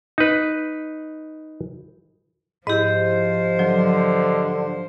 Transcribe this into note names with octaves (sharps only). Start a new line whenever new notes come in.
D#4 B4
G#2 F3 E4 G4 C5 D#5
D3 F#3